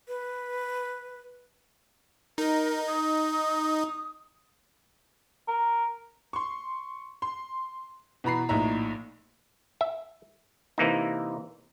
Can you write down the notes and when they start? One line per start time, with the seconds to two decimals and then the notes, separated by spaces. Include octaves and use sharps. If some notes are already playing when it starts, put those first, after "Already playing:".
0.08 B4
2.38 D#4 A#4
2.87 D#6
5.48 A#4
6.33 C6 C#6
7.22 C6
8.24 B2 E3 A#5 B5 C7
8.49 A#1 A2 D#4 E5 A#5
9.81 E5
10.78 C3 E3 A#3 D#4